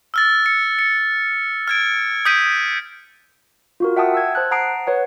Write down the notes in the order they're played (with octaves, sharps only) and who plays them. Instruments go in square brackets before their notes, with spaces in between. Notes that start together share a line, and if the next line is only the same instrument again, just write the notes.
[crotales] E6 F6 A6
C#7
C#7
F6 G#6 D7
D#6 G6 B6 D7 D#7
[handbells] F4 F#4 A#4
E5 F#5 G5 A5 D#6
E6 G#6
C5 A5 F#6
F#5 A5 A#5 D#6 C7 D7
B4 C#5 F#5